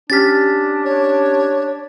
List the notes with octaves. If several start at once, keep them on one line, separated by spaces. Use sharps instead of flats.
C#4 D4 G4 F6 A6 B6
C#5